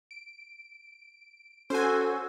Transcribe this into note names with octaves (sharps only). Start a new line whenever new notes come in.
D7
C#4 F#4 A4 C5 G#5 E6